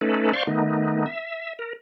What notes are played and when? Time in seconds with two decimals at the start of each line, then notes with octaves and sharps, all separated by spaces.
0.01 A3 C#4 D#4 A4 B4
0.33 C5 D5 F5 C6 C#6
0.47 D#3 A3 B3 D#4
1.06 E5
1.59 A#4